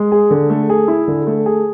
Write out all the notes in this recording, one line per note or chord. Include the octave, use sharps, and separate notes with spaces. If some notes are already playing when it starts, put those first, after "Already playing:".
Already playing: G#3
G#4
D3
A3
G#4
E4
D3
A3
G#4